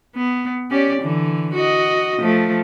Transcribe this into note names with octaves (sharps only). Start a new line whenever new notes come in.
B3
C#4 G4 D5
D3 E3
F#4 D#5
F3 A3